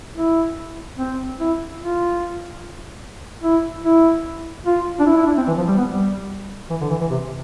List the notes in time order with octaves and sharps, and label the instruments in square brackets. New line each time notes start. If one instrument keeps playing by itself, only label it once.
[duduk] E4
C4
E4
F4
E4
E4
F4
D4
E4
E4
D4
C4
E3
F3
G3
B3
G3
E3
D3
E3
E3
C3